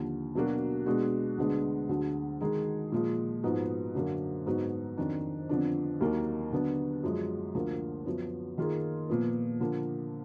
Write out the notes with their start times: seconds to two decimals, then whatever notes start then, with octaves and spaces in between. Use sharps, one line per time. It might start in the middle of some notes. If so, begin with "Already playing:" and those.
Already playing: D#2 D3 F3
0.35 B2 F#3 A#3 D4 F#4
0.86 B2 G#3 D4 F#4
1.38 D2 D3 G#3 B3 D4
1.89 D2 D3 F#3 D4 G#4
2.40 D#3 G#3 D#4 G#4
2.92 A#2 F3 G#3
3.43 G#2 F3 B3 D#4 F#4
3.95 F#2 D3 F#3 A#3
4.46 G#2 F#3 B3 D#4 F#4
4.97 F2 D#3 F#3 D4
5.49 F2 D3 F3 B3 D4
6.01 D#2 D#3 F#3 A#3
6.52 D3 F#3 B3 D4
7.03 F#2 F3 G#3
7.55 D2 D3 F3 A#3 F4
8.06 F#2 F3 B3
8.58 D#3 A#3 F4 G#4
9.09 A#2 F3 B3
9.60 D3 F3 A#3